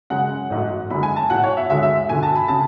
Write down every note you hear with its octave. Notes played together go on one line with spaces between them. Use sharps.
F#2 C#3 G#3 F#5
A1 G#2 F#3 A3
F#1 F#2 D3 G#3 B5
G#5
A5
B1 A2 F#3 F#5
C#5
E5
D2 D3 G#3 E5
E5
E1 D2 D3 F#3 G#5
A5
B5
C#3 F#3 A5